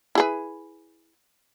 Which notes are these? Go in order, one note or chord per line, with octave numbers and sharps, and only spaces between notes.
E4 G#4 B4